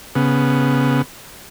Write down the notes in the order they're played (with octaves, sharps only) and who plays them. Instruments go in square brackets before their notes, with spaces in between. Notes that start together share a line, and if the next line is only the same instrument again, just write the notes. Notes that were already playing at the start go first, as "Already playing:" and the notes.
[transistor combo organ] C#3 B3